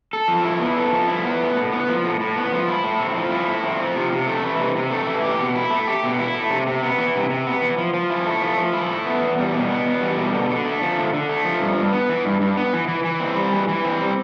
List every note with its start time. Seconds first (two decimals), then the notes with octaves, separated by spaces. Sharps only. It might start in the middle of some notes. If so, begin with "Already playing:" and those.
0.13 A4
0.28 F3
0.44 E4
0.60 B3
0.76 A4
0.92 F3
1.08 E4
1.24 B3
1.41 A2
1.56 A2
1.72 B3
1.89 F3
2.05 A2
2.20 A2
2.36 B3
2.52 F3
2.68 E4
2.84 A2
3.00 C4
3.16 F3
3.31 E4
3.48 A2
3.63 C4
3.80 F3
3.96 C3
4.12 C3
4.27 A3
4.43 E3
4.60 C3
4.76 C3
4.90 A3
5.07 E3
5.22 G4
5.39 B2
5.55 E4
5.70 A3
5.87 G4
6.03 B2
6.19 E4
6.35 A3
6.50 C3
6.67 C3
6.83 B3
6.99 E3
7.15 C3
7.30 C3
7.47 B3
7.62 E3
7.78 F3
7.94 F3
8.10 E4
8.27 A3
8.42 F3
8.58 F3
8.73 E4
8.90 A3
9.06 B3
9.21 E2
9.38 G3
9.54 B2
9.70 B3
9.86 E2
10.01 G3
10.17 B2
10.34 D3
10.50 D3
10.65 A3
10.82 F3
10.97 D3
11.13 D3
11.29 A3
11.45 F3
11.61 G2
11.78 G2
11.92 B3
12.09 E3
12.25 G2
12.41 G2
12.57 B3
12.73 E3
12.88 E3
13.04 E3
13.20 C4
13.36 G3
13.53 E3
13.68 E3
13.84 C4
14.01 G3